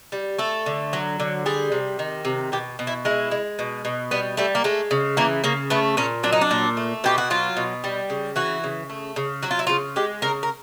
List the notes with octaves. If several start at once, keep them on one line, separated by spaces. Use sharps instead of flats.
G3
A3 A4
D3
F#3
D3
G3 G#4
C3
D#3
C3
B2 G4
B2
E4
G#3 E4
G#3
B2
B2
G3 B3
G3 A3
A#3
G#3 A3
C#3
E3 A#3
C#3 A#3
A3 B3
A#2 C#4
F#3 D4
D#4
D4
A#2
A3
B2 G4
F#4
F#3 F4
B2
G3
C#3
E3 F#4
C#3
A3
C#3
F#3 F#4
F4
E4
C#3 F4
G#3 G4
C#3 A#4
A#4